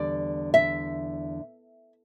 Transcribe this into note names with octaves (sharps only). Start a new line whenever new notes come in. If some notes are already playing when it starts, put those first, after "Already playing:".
Already playing: E2 D3 G3 D5
E5